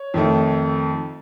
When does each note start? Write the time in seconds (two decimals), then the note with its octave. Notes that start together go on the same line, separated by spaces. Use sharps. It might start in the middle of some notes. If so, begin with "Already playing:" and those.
Already playing: C#5
0.14 F2 D#3 A3